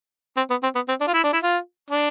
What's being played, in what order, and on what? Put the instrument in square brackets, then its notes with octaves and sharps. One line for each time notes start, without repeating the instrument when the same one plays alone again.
[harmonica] C4
B3
C4
B3
C4
D4
F4
E4
D4
E4
F4
D4